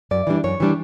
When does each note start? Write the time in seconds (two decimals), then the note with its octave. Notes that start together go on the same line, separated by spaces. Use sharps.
0.11 F#2 D5
0.27 E3 G3 D4
0.44 F#2 C#5
0.60 E3 G3 D4